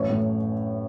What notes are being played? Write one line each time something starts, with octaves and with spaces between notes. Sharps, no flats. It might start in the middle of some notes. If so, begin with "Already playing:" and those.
Already playing: A1 F#2 C#5
A2